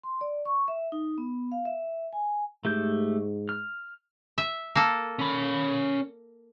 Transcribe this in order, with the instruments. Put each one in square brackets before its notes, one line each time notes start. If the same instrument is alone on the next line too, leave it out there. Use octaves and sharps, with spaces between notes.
[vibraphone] C6
D5
C#6
E5
D#4
B3
F5
E5
G#5
[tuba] G#2 [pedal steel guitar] A3 G4 G6
[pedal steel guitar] F6
[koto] E5
A#3 A4
[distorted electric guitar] C#4 B5